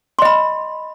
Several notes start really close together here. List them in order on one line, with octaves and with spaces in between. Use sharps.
C6 D#5 B5